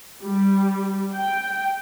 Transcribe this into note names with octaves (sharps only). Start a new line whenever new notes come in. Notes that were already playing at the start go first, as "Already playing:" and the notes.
G3
G5